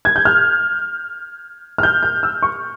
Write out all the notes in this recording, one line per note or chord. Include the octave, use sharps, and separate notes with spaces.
G#6
G6
F6
F6
G6
G6
E6
C#6